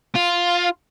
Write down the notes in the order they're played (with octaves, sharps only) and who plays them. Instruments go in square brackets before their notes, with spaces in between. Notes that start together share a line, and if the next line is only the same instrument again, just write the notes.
[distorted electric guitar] F4